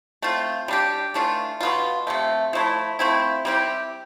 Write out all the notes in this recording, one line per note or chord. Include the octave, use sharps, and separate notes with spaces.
A3 C4 F4
G3 D4 G4
E3 A3 D4 F4
B2 B3 F4
C3 F3 A3
F3 A3 E4
F3 A3 C4 E4
G3 C4 E4 G4